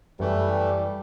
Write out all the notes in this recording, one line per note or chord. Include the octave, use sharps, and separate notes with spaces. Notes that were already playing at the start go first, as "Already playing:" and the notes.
F#2 E3 G3 A3